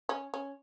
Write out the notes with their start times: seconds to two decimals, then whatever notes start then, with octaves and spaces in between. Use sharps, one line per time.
0.09 C#4
0.34 C#4